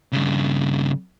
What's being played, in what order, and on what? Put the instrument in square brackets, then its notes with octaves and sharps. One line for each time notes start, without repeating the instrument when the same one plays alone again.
[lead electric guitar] G2 C#3